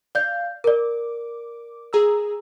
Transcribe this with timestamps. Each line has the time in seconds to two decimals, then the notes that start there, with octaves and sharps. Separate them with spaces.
0.15 D5 F5 G6
0.64 A#4 D5 D6
1.93 G#4 A#5 E6